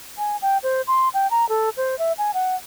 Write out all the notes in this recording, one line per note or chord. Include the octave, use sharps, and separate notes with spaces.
G#5
G5
C5
C6
G5
A#5
A4
C5
E5
G#5
F#5